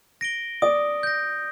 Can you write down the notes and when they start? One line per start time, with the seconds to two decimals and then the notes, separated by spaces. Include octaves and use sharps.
0.21 A#6 D7 G7
0.62 D5 D#6
1.03 G6 A#6